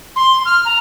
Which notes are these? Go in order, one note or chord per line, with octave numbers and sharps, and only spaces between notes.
C6
F6
A#5